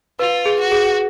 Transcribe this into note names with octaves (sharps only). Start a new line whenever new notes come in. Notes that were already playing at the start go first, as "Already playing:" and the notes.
F4 B4
G#4
F#4
G#4